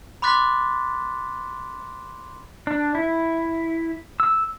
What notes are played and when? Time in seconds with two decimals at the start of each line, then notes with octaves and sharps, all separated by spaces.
0.22 B5 C6 D6 F#6 A6 B6
2.67 D4
2.95 E4
4.20 E6